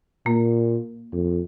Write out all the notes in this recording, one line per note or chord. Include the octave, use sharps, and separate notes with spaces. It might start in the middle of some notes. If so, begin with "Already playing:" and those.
A#2 A#3
F2